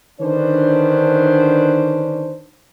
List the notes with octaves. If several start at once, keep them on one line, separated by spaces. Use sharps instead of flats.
D3 D#3 C#4 D4 B4 C5